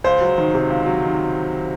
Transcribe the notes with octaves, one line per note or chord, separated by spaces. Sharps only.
C#2 C5
F#3
D#3
C3
C#2
F#3
D#3